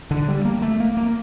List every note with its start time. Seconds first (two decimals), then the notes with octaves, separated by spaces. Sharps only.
0.11 D3
0.28 G3
0.45 A#3
0.62 A3
0.80 A#3
0.97 A#3